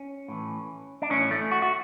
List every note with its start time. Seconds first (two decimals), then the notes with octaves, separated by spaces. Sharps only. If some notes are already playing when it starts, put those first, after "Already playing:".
Already playing: C#4
0.28 A2 E3
1.02 D4
1.10 A2 E3 C#4
1.31 A3
1.52 F#4
1.62 F#4